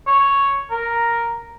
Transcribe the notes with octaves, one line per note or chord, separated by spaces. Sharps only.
C#5
A#4